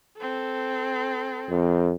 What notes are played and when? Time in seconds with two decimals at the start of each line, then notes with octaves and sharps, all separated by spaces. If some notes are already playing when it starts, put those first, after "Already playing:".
0.17 C4 A4
1.50 F2